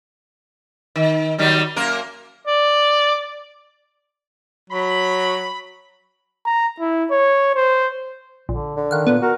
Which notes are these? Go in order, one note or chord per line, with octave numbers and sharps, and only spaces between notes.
D#3
D#3 F#3 G3
F#2 A#3 A#4
D5
F#3 B5
A#5
E4
C#5
C5
A#1 D3
D3
D#3 F5 F#5
A#2 B3
F#4 A#4